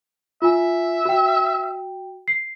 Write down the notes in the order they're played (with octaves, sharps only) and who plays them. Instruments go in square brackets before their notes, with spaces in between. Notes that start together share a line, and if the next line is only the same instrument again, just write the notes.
[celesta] F4 G#5 [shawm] E5
[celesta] F#4 G5
C7